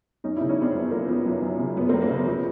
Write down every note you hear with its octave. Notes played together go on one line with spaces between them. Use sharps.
F#2 C#4 D#4
D4 E4
C#3
C#4 D#4
F3 C4 D4
F#2 B3
F3 A#3
F3 B3
F#2
F#2
C#3
F#2 B3
F#2 A#3 C4
A#3
C#3 B3
F3